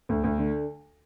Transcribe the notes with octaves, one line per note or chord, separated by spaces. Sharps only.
D2
D2
D3